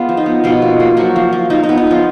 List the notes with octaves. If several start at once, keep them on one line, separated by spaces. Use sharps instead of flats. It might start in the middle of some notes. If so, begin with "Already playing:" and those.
Already playing: G#3 B3 F4
F3
D#4
B3
B2 F3 F4
A#3
A#3
F3 F#3 F#4
F3
F3
F3 D#4
D#4
B3
D#4
F3 B3 F4